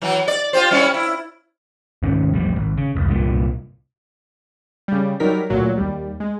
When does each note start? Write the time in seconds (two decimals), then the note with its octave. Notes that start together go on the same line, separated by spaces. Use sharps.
0.02 E3 F#3
0.28 D5
0.53 F4 G4 C5
0.71 G3 C#4 E4
0.94 E4
2.03 D#2 G#2 D#3 C#4
2.33 E1 A1 F3 G3
2.56 G#1
2.77 C#3
2.95 F1 C#2
3.08 C2 G2 A#2
4.88 C#3 G3
5.20 F#3 G3 D#4 A#4 B6
5.50 D2 A#2 F#3
5.77 D#2 G3
6.20 G#3